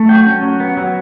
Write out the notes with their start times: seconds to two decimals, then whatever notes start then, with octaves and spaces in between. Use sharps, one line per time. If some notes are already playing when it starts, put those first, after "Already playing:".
Already playing: A3
0.09 F#3 G5
0.26 C#4
0.43 F#3
0.60 B3
0.77 F#3